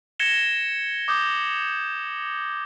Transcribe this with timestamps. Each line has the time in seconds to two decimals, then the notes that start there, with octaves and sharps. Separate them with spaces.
0.19 G#6 A#6 C#7 E7 G7
1.08 D6 D#6 G6